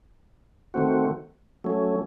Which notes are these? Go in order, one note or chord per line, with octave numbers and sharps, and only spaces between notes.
D#3 A3 C4 F#4
F#3 A3 C#4